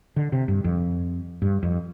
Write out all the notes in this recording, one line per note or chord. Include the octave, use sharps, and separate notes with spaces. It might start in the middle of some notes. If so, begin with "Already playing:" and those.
D3
C3
G2
F2
G2
F2